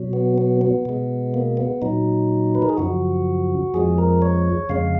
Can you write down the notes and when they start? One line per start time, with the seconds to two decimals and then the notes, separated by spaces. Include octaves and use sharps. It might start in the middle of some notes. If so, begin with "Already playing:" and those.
Already playing: B2 F#3
0.13 B3
0.38 B3
0.61 B3
0.85 B2 G#3
1.34 A#3
1.57 B3
1.82 A#2 F#3 D#4
2.55 B4
2.62 A#4
2.69 G#4
2.77 F#2 C#3 F3 F#4
3.74 F2 F3 G#3 G#4
3.98 A#4
4.22 C#5
4.69 F2 C#3 G#3 F5